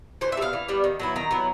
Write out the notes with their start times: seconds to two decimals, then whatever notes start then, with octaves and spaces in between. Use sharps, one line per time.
0.21 E3 C5
0.32 E5
0.37 G3
0.41 B3 F5
0.53 E3
0.68 G3 B3
0.84 D#3
0.99 F#3 B3 E4
1.16 D#3 A#5
1.31 F#3 B3 E4